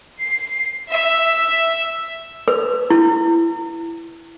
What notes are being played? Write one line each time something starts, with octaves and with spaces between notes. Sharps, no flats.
C7
E5
B4
E4